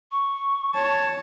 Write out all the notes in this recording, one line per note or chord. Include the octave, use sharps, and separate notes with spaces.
C#6
C#5 A5